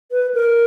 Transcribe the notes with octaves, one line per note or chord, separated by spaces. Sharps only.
B4
A#4